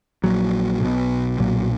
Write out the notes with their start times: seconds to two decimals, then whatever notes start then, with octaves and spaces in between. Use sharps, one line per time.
0.23 A#1 A#2 F#3
0.81 B1 B2
1.39 B1 A#2 F#3